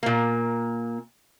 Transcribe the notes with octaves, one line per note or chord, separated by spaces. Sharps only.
A#2 A#3